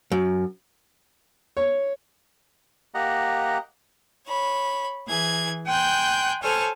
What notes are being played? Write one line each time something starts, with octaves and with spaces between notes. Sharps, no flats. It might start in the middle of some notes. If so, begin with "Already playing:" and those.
F#2
C#5
A#3 G4 D#5 F#5 A#5
C#5 B5
E3 G#4 G#6
G5 G#5 C6 F#6 G6
A4 C5 C#5 G#5 A5 F6